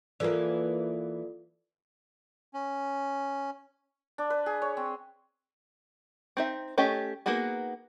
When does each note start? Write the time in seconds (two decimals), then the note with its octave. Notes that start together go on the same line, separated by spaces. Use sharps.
0.20 E3 A#3 F4 A4 D5
2.54 C#4
4.18 D4
4.30 B4
4.46 G#4
4.62 C#5
4.77 C4
6.37 C4 D#4 E5
6.78 A3 C#4 G4 D#5
7.26 A#3 B3 D#4 F#4 G#4